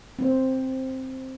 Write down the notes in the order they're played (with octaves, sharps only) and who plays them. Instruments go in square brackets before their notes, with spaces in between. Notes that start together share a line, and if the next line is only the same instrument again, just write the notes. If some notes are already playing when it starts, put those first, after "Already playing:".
[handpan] C4 C5